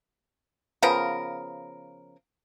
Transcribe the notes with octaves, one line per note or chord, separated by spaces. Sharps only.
C#3 F3 B3 A#4